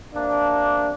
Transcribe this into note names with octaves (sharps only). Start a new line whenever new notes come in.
C3 A#3 D4